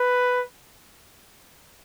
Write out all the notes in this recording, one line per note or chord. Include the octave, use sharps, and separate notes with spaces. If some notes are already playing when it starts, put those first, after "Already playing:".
Already playing: B4